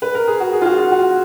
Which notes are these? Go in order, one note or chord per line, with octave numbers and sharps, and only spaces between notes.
B4
A#4
G#4
F#4
G#4
F4
F#4
F4
F#4